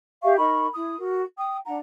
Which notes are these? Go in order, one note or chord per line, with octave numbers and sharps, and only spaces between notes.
G4 E5 F5 C#6
D#4 A#4 B5 C#6
E4 D#6
F#4 A#4
G5 D#6
D4 F#5 A#5